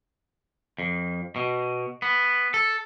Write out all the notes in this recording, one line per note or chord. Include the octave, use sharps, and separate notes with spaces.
F2
B2
B3
A4